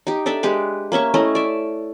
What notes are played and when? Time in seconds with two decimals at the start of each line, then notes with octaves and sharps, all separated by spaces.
0.07 D#4 G4
0.26 D4 A4 D5 E5
0.43 G#3 G4 B4
0.92 A#3 C#4 E5 C#6
1.14 A3 C#4 E4 D#5
1.35 D5 E5